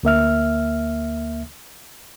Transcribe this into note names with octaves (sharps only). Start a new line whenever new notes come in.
D2 A#3 E5 F6